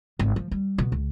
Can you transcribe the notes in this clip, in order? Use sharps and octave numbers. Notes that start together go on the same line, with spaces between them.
G#1
F3
G3
B2
C#2